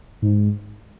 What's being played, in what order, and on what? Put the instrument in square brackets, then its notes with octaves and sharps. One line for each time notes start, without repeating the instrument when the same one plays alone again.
[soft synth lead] G#2